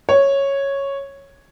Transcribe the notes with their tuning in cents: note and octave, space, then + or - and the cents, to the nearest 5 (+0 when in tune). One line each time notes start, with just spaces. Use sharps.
C#5 -5